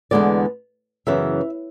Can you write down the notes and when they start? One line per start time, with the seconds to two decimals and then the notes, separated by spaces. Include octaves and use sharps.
0.11 E2 D3 G#3 B3 D5
1.07 F#2 C#3 E3 B3 E5